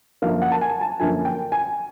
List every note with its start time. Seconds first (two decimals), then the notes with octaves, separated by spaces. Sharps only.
0.22 F#2 D3 F3 A#3 F5
0.42 F#5
0.52 A5
0.61 G#5
0.81 A5
1.00 F#2 D3 F3 A#3 G#5
1.25 G5
1.52 G#5